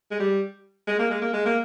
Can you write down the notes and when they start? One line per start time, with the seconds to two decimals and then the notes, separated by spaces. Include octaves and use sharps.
0.11 G#3
0.20 G3
0.87 G#3
0.99 A#3
1.10 G#3
1.22 A#3
1.33 G#3
1.45 A#3